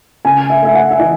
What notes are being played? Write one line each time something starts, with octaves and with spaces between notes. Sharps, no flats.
C#3 G#5
E5
A3 E5
F#5
E5
E3 D#5